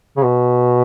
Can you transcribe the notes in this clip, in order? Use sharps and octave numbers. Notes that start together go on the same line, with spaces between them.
C#3
B2